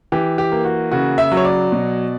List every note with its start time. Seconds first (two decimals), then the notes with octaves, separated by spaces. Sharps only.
0.12 E3 G4
0.38 G4
0.52 A#3
0.65 F#4
0.91 C#3 F#4
1.18 E5
1.32 F#3
1.37 C#5
1.45 D5
1.72 B2